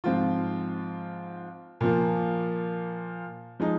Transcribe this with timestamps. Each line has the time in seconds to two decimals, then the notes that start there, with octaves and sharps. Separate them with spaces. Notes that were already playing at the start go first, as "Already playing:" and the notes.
0.04 G#2 F3 C4 F4
1.81 A#2 F3 A#3
3.60 F3 G#3 D#4